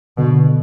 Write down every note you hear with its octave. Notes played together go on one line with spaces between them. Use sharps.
B2 D3